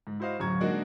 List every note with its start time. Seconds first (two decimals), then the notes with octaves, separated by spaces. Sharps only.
0.07 G#2
0.20 E4 F#4 C5 D#5 F5
0.40 D1 F#2 A#5 C#6 G#6
0.60 G#3 A#3 D4 D#4 F#4